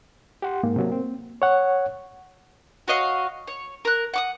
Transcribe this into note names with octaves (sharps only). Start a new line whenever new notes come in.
G4 F#5 C6
G#2 A#3
C3 F#3
C4
C#5 F#5
F#4 C#5 D#5 F5
C#5
A#4 F#6
F#5 D6 D#6